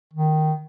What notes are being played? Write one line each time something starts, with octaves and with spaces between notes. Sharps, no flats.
D#3